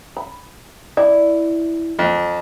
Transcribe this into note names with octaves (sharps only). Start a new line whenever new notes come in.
B5
E4 D5
F2